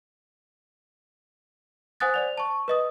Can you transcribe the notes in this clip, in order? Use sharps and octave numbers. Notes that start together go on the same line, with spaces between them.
C5 F#5 G#5 D#6 F#6 A6
C5 D5 F7
A5 C#6
B4 D#5 D#6